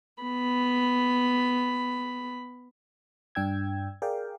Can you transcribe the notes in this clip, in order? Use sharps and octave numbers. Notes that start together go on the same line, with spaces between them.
B3 B5
G2 D4 G5 E6 G#6
G#4 A#4 D5 F5 G5